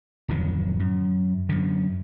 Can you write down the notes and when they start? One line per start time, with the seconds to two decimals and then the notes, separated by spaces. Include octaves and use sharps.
0.28 D1 F2 D#3 F#3
0.80 F#2
1.49 F#2 D3